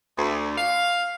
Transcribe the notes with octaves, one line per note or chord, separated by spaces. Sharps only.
D2
F5